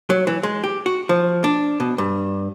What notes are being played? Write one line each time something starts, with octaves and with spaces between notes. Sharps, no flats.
F#3
E3
G#3
G4
F#4
F3
D4
B2
G2